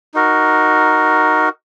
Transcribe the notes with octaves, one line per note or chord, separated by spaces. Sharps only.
D#4 F#4 A#4